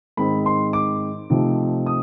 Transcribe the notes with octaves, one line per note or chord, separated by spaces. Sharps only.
G#2 D#3 G#3 C4 D#4 B5
C6
D6
C3 F3 A3 C4 D#4
D#6